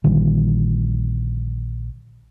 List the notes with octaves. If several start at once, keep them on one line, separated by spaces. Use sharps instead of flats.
A#1 D3 D#3 G3